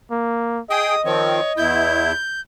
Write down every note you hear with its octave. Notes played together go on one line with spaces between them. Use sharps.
A#3
G#4 D#5 G5 D#6
D#3 F3 C4 C#5
E2 E4 G6